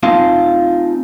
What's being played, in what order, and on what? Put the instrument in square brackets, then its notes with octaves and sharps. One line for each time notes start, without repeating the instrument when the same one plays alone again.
[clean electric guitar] C4 D#4 F4 F5 A5 C6